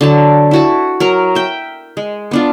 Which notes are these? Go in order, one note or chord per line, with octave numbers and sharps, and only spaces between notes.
D3 F#3 A5
E4 F#4 A5
F#3 A#4 A#5
E5 G5
G#3
B3 D4 F4